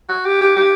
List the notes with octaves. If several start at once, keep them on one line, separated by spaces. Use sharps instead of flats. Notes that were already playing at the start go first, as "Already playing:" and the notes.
F#4
G4
G4
G4